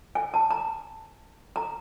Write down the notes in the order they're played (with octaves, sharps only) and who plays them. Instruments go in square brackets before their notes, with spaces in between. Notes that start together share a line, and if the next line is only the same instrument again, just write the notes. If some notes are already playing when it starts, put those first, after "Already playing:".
[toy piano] G#5
A5
A#5
A#5